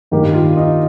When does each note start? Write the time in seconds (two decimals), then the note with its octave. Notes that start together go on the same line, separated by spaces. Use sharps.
0.11 G2 D#3 A#3 G4
0.34 F4
0.56 D#4